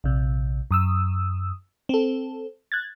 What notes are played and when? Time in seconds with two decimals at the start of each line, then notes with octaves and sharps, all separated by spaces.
0.04 A#1 C3
0.71 F#2 D#6 E6
1.89 C4 A4
2.72 F#6 G#6 A6